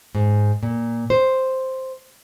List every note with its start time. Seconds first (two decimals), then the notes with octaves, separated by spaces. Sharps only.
0.15 G#2
0.63 A#2
1.10 C5